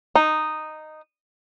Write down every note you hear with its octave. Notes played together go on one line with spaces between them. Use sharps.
D#4